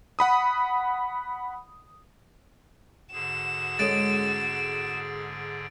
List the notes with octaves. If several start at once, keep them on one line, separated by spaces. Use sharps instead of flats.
F#5 B5 D#6
G#2 D3 F#4 G#4 E7
G#3 C#4 A4 A6 D7